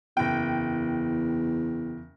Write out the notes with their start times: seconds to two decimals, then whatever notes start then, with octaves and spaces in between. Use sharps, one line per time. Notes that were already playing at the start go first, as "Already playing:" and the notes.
0.17 F#1 E2 G5